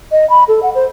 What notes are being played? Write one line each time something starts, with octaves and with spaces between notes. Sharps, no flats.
D#5
B5
A4
F#5
C5